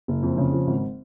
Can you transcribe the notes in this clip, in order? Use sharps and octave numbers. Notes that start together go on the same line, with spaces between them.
F#1
F2
C#3
F3
G#1